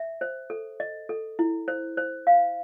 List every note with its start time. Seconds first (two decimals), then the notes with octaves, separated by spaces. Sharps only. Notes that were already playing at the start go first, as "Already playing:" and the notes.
Already playing: E5
0.21 C5
0.50 A4
0.80 D#5
1.09 A4
1.39 E4
1.68 C5
1.97 C5
2.27 F5